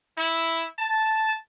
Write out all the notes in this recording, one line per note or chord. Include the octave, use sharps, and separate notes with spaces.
E4
A5